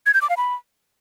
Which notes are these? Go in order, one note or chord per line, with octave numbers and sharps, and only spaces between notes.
G#6
G6
D6
F5
B5